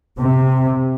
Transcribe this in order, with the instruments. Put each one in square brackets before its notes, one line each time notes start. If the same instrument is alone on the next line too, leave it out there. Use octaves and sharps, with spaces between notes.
[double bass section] C3